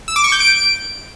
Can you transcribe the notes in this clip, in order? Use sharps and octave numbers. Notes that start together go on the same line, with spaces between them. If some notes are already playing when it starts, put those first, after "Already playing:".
E6
D6
C#6
G6
D7